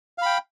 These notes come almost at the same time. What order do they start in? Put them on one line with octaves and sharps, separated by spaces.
F5 B5 G5